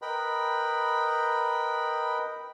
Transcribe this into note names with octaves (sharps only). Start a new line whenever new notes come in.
A#4 B4 D#5 G5 B5